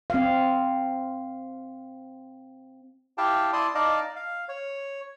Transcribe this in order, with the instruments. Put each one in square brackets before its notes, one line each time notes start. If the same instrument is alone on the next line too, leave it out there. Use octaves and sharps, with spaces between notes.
[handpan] C4 F5
[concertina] E4 G4 F5 G5 A5
E4 D5 A5 C6 D#6
D#4 D5 D#5 F5 A5 D6
F5
C#5